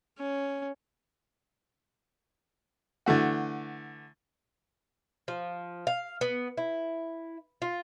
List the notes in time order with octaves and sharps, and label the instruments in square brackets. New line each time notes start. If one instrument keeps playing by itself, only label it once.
[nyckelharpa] C#4
[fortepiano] D3 E3 A3 F#4
[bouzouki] F3
F5
B3
E4
F4